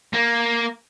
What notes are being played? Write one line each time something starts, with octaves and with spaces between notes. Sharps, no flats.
A#3